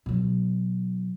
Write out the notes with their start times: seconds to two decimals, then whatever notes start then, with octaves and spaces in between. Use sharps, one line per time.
0.06 B2 F#3